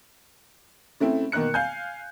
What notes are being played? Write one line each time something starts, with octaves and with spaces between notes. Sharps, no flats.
C#3 A3 C4 E4
B2 D#3 A#3 F#6 C#7
F5 G#5 G6